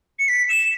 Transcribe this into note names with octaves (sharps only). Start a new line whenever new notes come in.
C#7
B6
E7